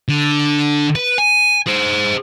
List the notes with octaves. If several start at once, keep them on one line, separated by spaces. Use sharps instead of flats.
D3
B4
G#5
G#4 C5